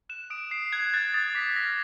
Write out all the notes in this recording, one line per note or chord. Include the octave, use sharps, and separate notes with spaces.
F#6 E7
D#6 D7
D#6 C7
F#6 G#6
F#6 A6
D#6 A6
D6 B6
F6 A#6